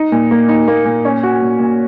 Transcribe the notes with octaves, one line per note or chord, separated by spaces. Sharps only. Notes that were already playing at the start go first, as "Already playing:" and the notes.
Already playing: D#4
A#2
A#3
D#4
A#3
A#2
C#4
F#4
A#2
A#2